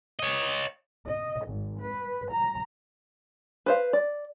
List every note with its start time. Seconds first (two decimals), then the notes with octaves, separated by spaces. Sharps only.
0.19 C#5 D#5
1.06 D#5
1.47 G#1
1.79 B4
2.31 A#5
3.66 B4 C5 F5
3.93 D5